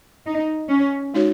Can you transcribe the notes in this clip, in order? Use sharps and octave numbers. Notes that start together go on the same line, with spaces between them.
D#4
C#4
G#3 D#4 F#4 C#5